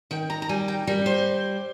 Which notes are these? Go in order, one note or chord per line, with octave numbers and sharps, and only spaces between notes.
D#3 G5
A#5
A#5
G3 G#5
G5
G3 A#4
C5